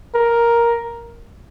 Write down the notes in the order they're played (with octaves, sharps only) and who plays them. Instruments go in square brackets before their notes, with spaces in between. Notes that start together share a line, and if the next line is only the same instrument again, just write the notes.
[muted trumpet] A#4